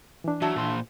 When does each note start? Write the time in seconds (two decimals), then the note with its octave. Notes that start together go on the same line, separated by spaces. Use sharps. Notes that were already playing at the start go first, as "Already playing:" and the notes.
0.24 E3 D4
0.42 F#3 A3 A4
0.56 A#2 C5